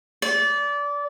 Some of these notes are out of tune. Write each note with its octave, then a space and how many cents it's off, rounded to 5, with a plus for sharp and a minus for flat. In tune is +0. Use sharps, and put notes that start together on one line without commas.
D5 -25